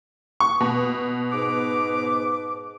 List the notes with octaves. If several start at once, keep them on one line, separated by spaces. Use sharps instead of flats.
C#6
B2
G#2 B4 D6